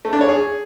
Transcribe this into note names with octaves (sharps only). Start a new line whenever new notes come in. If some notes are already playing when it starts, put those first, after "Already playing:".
A3
D4
C#5
G#4